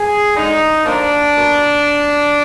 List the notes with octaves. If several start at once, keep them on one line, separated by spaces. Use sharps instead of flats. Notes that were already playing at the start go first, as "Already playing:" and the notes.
Already playing: G#4
D3 G#3 D#4
D3 F3 A#3 D4
B2 A#3